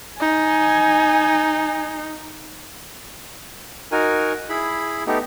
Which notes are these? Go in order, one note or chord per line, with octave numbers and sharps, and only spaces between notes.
D#4 G#5
D#4 F#4 A#4 G#5
E4 G#4 B5
A3 B3 D#4 G4